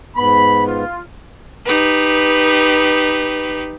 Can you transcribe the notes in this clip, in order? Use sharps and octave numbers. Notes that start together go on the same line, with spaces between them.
G#2 B3 B5
F4
D#4 G4 B4